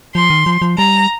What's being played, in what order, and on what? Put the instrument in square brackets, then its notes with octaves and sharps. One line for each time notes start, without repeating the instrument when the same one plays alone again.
[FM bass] F3 [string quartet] C6
[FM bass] D#3
F3
F3
[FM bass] G3 [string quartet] A#5